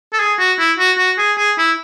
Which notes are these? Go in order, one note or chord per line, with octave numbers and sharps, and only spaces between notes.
A4
G#4
F#4
E4
F#4
F#4
G#4
G#4
E4